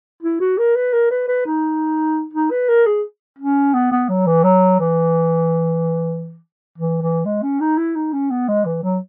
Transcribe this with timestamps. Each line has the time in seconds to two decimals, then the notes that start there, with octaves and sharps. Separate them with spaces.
0.23 E4
0.41 F#4
0.58 A#4
0.76 B4
0.93 A#4
1.11 B4
1.28 B4
1.46 D#4
2.33 D#4
2.51 B4
2.69 A#4
2.86 G#4
3.39 C#4
3.74 B3
3.92 B3
4.09 F#3
4.27 E3
4.44 F#3
4.80 E3
6.78 E3
7.02 E3
7.25 G#3
7.43 C#4
7.61 D#4
7.78 E4
7.96 D#4
8.13 C#4
8.31 B3
8.49 G#3
8.66 E3
8.83 F#3